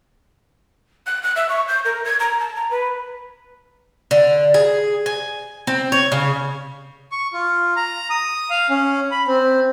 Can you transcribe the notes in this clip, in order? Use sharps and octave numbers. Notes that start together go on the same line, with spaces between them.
F#6
F#6
E5
C#6
G6
A#4
G#6
A#5
A5
A#5
B4
D3
G#4
G#5
C4
C#5
C#3
C#6
F4
A#5
D#6
F5
C#4
B5
C4